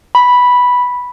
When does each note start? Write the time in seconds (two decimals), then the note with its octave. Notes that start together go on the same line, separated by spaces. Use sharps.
0.15 B5